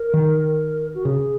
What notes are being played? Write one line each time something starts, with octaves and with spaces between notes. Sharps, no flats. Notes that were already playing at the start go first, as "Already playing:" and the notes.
Already playing: A#4
D#3
F#4
C#3 G#4